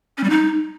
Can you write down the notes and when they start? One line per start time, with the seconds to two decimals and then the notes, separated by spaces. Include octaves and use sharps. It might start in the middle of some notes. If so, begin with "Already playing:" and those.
0.18 C#4
0.24 G3
0.30 D#4